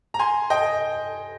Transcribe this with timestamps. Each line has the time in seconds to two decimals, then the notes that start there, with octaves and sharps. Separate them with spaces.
0.14 A#5
0.19 G#5 C6
0.50 D#5 G5